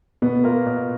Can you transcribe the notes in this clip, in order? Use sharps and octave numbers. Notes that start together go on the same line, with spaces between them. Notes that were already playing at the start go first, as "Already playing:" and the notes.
B2 B3
A#3 F4 A#4
B2